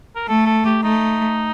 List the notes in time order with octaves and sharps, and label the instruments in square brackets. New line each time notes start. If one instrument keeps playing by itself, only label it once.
[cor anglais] A#4
[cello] A3 [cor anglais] A4
[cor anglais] A4
G4
[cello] A3 [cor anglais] D#4